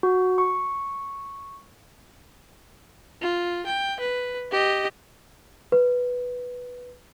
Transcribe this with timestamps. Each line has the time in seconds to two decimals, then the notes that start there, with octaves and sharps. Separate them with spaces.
0.03 F#4
0.38 C#6
3.22 F4
3.67 G5
4.00 B4
4.52 G4 D#5
5.72 B4